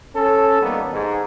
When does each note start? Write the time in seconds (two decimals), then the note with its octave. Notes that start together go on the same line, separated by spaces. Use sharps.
0.15 C#4 A4
0.62 D#3 G3 A#3 B3
0.91 G#2